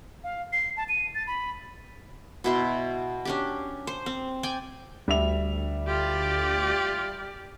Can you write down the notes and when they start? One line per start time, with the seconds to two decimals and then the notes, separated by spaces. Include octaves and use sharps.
0.24 F5
0.53 C7
0.77 A5
0.89 D#7
1.15 A6
1.27 B5
2.44 B2 E4 C6
3.25 C#4 D4 G4
3.87 C5
4.06 C4
4.43 D5 G5 G#5
5.08 D2 G3 E5 F7
5.87 F4 G4 D5